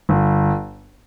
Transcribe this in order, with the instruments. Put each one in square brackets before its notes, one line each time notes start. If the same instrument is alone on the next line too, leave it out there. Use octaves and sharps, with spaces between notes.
[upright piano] G1